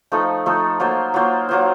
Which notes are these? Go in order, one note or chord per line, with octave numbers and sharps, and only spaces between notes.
F3 A3 D#4 A4
F3 A3 D#4 A4
F#3 A#3 F4 C5
F#3 A#3 F4 C5
F#3 A#3 F4 C5